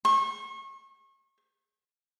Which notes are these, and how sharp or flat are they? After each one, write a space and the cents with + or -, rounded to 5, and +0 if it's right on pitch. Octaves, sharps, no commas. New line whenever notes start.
C#6 -35